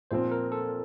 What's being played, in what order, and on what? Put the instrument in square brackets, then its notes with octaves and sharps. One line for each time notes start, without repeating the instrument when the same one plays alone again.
[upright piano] A#2 F3 C4 [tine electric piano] C5
[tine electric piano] A#4
A4